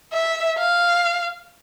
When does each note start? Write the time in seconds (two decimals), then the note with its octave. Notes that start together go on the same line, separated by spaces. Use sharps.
0.13 E5
0.58 F5